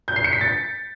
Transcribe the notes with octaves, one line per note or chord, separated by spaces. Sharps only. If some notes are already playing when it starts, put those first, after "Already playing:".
G6
C7
C#7
B6
A6